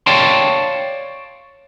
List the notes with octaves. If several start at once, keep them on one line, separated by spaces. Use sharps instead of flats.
C#5 D5 F5 G5 A5 C6